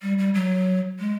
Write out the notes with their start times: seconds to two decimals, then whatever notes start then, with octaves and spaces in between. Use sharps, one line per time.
0.02 G3
0.18 G3
0.34 F#3
0.99 G#3